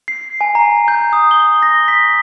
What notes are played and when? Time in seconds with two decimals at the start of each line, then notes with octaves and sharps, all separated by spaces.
0.08 C7
0.41 G#5
0.55 A#5
0.88 G6
1.13 D#6
1.31 G7
1.63 A#6
1.88 B6